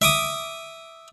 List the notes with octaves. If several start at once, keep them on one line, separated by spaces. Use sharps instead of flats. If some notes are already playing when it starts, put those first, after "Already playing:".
E5 D6 D#6